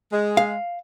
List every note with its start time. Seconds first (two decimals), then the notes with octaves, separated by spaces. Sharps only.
0.12 G#3
0.37 F5